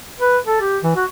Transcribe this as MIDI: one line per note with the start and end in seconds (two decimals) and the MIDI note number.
0.20 0.38 71
0.46 0.59 69
0.60 0.78 67
0.83 0.91 52
0.96 1.04 66